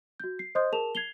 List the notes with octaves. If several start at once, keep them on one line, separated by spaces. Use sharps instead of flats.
F#4 G6
C7
C5 D#5 C6 D#6 G6
G#4 A#4 A5 E7 F7
G#6 C7 F7 G7